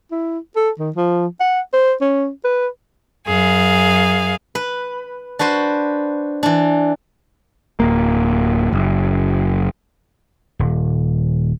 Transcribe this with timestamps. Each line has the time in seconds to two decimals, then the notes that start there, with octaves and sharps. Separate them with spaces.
0.11 E4
0.56 A4
0.79 D#3
0.96 F3
1.40 F#5
1.73 C5
2.01 C#4
2.44 B4
3.26 F#2 G#4 F5
4.55 B4
5.39 D4 F#4 B4 C5
6.43 E3 D4
7.80 D1 A#3
8.73 F#1
10.59 D#1